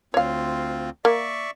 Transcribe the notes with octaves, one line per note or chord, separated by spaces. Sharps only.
D2 C4 F4 C#5 F5
A#3 D5 E5 C#6